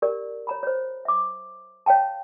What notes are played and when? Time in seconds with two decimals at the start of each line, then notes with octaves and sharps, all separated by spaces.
0.02 G4 A#4 D5
0.47 C#5 A#5 B5
0.63 C5 C#5
1.05 E5 D6
1.86 C#5 F5 G5 A5